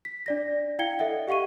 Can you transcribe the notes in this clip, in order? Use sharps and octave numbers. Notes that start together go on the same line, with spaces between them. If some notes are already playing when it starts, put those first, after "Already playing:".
B6
D4 D5 A#6
E4 F5 G5 G#6 C#7 G7
A4 D#5 E5 F#5
G4 F5 F#5 C#6 D#7